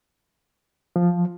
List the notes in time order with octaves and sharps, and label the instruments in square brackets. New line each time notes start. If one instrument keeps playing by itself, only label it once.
[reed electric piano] F3